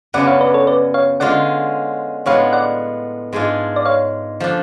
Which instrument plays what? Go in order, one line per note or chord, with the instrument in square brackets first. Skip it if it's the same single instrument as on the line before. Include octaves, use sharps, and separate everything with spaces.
[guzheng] F#2 C#3 F#3 B3 D4 [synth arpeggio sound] D5 F#5
[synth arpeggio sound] C#5 F5
B4 D5
A4 C#5
B4 D5
C#5 F5
[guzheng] D3 G#3 C#4 F4 [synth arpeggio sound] D5 F#5
[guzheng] A2 G#3 B3 D4 F4 [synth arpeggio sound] C#5 F5
[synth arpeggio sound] D5 F#5
[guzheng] G#2 G#3 D4 F4
[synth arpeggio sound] D5
C#5 F5
[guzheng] F3 A3 D4